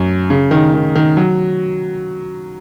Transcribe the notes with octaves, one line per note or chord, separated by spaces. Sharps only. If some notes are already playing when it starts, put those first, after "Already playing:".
Already playing: F#2
C#3
D#3
D#3
D#3
F#3